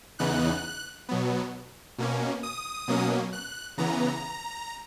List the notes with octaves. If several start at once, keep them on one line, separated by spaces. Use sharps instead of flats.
E2 C#3 E3 B3 D#4 F#6
B2 F#3 B3
B2 A#3 C#4
D#6
B2 F#3 A#3 C#4
F#6
C#3 E3 B3 A#5